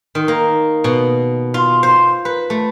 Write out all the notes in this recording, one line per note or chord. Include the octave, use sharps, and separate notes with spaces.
D#3
A#3
B2
F4
C5
B4
A3